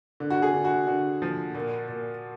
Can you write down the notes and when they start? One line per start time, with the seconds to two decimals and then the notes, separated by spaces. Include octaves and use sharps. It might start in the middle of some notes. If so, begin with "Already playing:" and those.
0.20 D3
0.30 F#4
0.42 G#4
0.54 D3
0.64 F#4
0.87 D3 F#4
1.22 F3
1.55 A#2
1.89 A#2